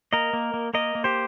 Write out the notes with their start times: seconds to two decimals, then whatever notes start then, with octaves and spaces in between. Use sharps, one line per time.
0.13 A#3 A#4 D#5
0.33 A#3
0.54 A#3
0.74 A#3 A#4 D#5
0.95 A#3
1.04 G4 C5